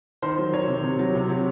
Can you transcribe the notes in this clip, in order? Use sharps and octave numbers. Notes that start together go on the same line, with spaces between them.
D#3 C5
F#3
D#3 C#5
C3
C3
F#3
C3
F#3